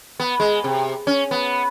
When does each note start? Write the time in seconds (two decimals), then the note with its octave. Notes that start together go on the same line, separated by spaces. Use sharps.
0.20 B3
0.40 G#3
0.64 C3
1.07 C#4
1.31 B3